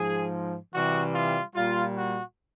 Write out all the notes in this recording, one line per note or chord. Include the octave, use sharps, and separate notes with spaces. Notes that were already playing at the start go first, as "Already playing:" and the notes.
Already playing: G#2 F3 G#4
C3 E3 G3 F#4
F4
A#2 G3 F4
F#4